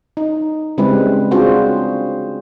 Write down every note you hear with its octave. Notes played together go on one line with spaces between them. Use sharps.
D#4
C#3 G3 G#3 C4 E4 B4
C4 D4 F4 F#4 G#4 C5